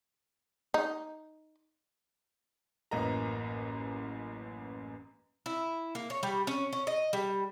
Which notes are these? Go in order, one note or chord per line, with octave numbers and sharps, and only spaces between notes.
D#4
A1 F#2 A#3 B4 D#5 A#5
E4
A#3
C#5
G3
C#4
C#4
D#5
G3